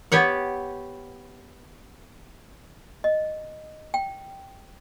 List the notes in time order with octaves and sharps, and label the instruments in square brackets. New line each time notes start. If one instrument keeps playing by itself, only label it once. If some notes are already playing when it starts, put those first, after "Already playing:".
[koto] B3 G4 C#5 F#5
[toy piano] D#5
G5